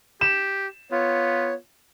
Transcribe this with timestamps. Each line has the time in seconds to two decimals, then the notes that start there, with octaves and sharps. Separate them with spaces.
0.21 G4 E7
0.92 B3 F4 C#5